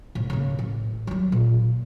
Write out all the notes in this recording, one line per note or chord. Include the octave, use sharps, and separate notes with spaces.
C2 A2
C#3 A#3
A1
F#3 G3
A#2